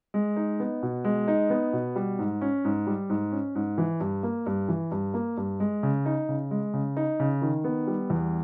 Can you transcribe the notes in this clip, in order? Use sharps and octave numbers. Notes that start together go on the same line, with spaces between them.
G#3
D#4
B3
B2
G#3
D#4
B3
B2
G3
G#2
C#4
G#2
G3
G#2
C#4
G#2
E3
G2
A#3
G2
E3
G2
A#3
G2
G#3
C#3
D#4
C#3
G#3
C#3
D#4
C#3
D#3
B3
G3
E2